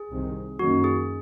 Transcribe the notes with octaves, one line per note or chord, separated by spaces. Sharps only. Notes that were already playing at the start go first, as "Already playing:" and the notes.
Already playing: G#4
C2 C3 D#3
F#2 D#3 A#3 C#4 F#4
G#4